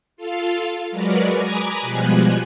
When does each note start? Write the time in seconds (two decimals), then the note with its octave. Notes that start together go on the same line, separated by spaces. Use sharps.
0.17 F4 A4 F5
0.91 F#3 G#3 F#4 A#4 B4 D5
1.29 G#5 A#5 B5 D6 D#6 G#6
1.79 B2 F3 G3 G#3 G#4 F#6